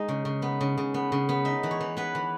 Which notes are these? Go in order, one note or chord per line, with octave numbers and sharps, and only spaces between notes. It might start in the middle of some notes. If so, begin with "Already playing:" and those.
Already playing: G#3 D#4
C#3
C#3
B3
C#3
C#3
B3
C#3
B3
D#4 E5
E3
C#5
E3
B3 B4
E3